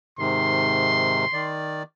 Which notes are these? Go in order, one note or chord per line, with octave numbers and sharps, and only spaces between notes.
G#2 C3 D#3 C6
D#3 D5